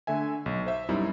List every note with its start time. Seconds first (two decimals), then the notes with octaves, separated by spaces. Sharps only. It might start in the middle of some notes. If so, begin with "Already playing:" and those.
0.07 D3 A3 E5 G#5
0.46 B1
0.66 C5 E5
0.89 F#2 B2 G3 C4 D#4 E4